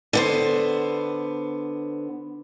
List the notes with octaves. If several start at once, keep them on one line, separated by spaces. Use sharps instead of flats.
D3 B3 C5